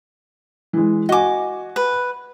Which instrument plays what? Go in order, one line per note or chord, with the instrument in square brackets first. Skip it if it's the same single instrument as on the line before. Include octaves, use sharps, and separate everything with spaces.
[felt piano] E3 G#3
[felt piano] F#4 G#5 [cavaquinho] D#5 D6
[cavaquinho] B4